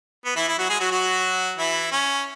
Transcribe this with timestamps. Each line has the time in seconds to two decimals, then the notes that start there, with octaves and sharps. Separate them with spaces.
0.25 B3
0.36 E3 E4
0.48 E4
0.59 F#3 F#4
0.69 G#3 G#4
0.80 F#3 F#4
0.91 F#3 F#4
1.58 E3 E4
1.92 C#4